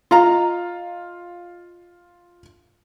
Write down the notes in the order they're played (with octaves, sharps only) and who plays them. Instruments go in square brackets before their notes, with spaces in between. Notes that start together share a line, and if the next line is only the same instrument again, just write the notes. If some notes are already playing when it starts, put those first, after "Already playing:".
[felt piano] F4 F5 [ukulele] D#5 A#5